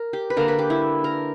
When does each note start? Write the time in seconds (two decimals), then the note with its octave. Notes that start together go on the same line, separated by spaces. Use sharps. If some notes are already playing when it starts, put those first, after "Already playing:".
Already playing: A#4
0.13 G4
0.30 B4
0.37 D3 A#3 D4 A#4
0.48 B4
0.59 G4
0.70 E4
1.04 A#4